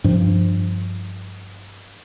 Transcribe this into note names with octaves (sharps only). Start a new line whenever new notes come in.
G2 F3